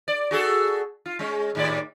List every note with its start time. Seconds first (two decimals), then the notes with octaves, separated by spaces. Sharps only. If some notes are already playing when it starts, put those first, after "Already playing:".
0.08 D5
0.31 F#4 G#4 A4
1.06 F4
1.19 G#3 C#4
1.55 D#2 A2 D5